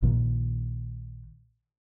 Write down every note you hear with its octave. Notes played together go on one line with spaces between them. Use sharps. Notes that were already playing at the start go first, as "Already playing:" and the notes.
A#1 A#2 D#3